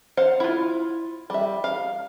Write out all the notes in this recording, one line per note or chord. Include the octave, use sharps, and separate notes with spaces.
C5 F5 F#5
E4 F4
G3 E5
F5